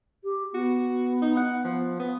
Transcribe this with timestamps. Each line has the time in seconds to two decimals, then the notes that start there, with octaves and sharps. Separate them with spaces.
0.24 G4
0.54 B3 F#4
1.22 D#4
1.37 F#5
1.64 F3
2.00 B3